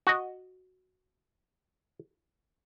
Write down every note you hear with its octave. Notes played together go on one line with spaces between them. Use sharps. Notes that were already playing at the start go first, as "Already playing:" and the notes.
F#4 D#5